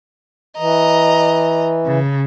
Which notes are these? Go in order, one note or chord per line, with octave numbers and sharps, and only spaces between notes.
E3 D#5 A#5
C#3